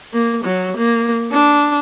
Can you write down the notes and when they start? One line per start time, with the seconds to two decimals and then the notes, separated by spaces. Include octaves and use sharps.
0.13 A#3
0.44 F#3
0.77 A#3
1.32 D4